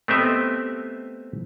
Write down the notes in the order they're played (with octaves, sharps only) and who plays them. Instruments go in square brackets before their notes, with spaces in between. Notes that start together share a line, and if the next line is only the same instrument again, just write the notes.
[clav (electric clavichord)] A3 B3 C4 G4 D#5 E5